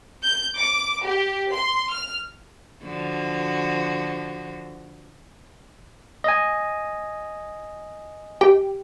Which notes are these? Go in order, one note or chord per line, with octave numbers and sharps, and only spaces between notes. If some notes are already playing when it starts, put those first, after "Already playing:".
G6
D6
G4
C6
F6
D3 F3 F#4
D#5 G#5
G4 G5